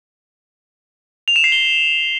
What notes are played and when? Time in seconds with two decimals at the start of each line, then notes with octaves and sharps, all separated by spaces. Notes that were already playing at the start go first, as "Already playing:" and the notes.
1.28 F7
1.36 E7
1.44 C7
1.52 G7